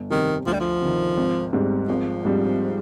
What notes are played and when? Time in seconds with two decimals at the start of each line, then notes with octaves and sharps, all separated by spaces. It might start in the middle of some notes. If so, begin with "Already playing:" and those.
Already playing: G1
0.10 F2 C3 D#3 G3 C4
0.46 D2 F3
0.53 G3
0.60 F3
0.81 C3 D#3
1.17 G#1
1.53 G#2 G3 C4
1.88 G#1 F3
2.25 G#2 G3 C4